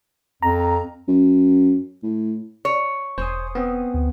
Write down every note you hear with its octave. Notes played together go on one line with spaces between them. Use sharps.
F2 A#5
F#2
A2
C#5
E1 C5 G#5 C6 D#6
B3 C4
D2